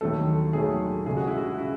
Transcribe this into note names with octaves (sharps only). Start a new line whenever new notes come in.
D#2 D#3 F#3 A3 A4
D#2 D#3 F#3 A3 G#4
C#2 C#3 G#3 G#4
F#4
E4
F#4
C#3 G#3 E4